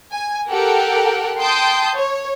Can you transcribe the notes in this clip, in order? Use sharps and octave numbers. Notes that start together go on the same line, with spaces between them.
G#5
G4 A4 A#4 F#5 G5
G5 A5 C6 D#6 G6
C#5